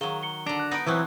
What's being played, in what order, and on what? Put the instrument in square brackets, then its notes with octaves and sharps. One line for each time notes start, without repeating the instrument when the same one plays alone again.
[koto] D#3 F#3 [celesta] G#4 F5 G7
[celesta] C#7 G7
[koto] D3 A#5 [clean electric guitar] D4
[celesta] F#6
[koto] B3 D#4 B4 [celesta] A#6 D7
[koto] B2 F#3 C4 [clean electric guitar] E3 [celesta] B4 D#6 F#6